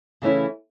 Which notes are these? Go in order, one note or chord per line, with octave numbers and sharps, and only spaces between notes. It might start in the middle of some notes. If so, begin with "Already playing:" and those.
C#3 E3 A3 C#4 E4